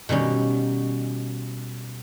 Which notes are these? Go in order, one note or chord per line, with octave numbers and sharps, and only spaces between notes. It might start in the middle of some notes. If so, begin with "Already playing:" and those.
B2 D#3 G3 C#4